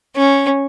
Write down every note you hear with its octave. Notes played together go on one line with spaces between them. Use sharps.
C#4